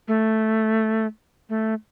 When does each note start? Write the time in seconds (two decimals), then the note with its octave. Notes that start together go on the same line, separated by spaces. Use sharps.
0.08 A3
1.49 A3